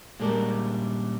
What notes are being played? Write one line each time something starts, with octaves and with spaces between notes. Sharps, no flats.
A#2 G3 G#3 D4 A#4